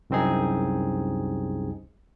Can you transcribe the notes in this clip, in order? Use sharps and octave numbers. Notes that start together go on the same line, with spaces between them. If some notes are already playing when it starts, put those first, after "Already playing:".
C2 F#2 C4 D#4 G#4